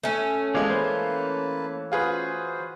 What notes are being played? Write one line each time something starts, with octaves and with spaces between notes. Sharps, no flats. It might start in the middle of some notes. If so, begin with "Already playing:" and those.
A3 C#4
E3 F3 G#3 A#3 C#5 D5 F5
A#3 B4 C5 A5
F4 F#4 G#4 B4 C5